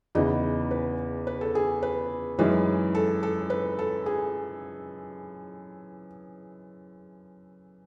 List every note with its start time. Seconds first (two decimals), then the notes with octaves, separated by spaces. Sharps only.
0.15 E2 C#3 E3 B3 D#4 D#5
0.71 B4
1.27 B4
1.41 A4
1.55 G#4
1.83 B4
2.39 F#2 E3 G#3 D#4 B4
2.95 A4
3.23 A4
3.50 B4
3.79 A4
4.06 G#4